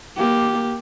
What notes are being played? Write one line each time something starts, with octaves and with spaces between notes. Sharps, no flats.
A#3 G4